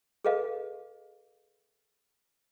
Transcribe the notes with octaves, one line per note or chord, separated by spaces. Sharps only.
G#4 A4 B4 D#5 F5